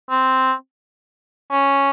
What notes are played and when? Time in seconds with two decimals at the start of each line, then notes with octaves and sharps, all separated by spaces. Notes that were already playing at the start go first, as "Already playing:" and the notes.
0.10 C4
1.52 C#4